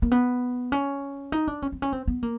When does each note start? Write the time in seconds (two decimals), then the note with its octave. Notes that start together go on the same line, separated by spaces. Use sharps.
0.02 A#3
0.12 B3
0.72 C#4
1.32 D#4
1.48 D4
1.62 C#4
1.72 C4
1.82 C#4
1.93 C4
2.08 B3
2.23 A#3